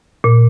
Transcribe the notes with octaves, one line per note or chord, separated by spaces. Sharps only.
A#2